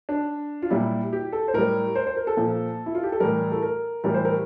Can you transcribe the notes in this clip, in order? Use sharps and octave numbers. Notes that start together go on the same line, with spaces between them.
D4
F4
A#2 G3 E4
G4
A4
C5
A2 G3 A#4
C5
C5
A#4
A4
A#2 F3
E4
F4
G4
A4
A2 E3 G3 A#4
A4
A#4
A2 E3 G3 A#4
C5
A#4